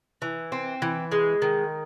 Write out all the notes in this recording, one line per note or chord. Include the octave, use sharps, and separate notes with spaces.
E3
C4
E3
G#3
D#3